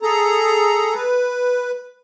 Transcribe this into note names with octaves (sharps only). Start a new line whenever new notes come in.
G#4 A4 A#5
B4